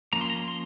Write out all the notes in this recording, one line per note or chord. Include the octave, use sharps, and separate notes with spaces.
F3 A#3 C#4 A#5
C6
A#5
C6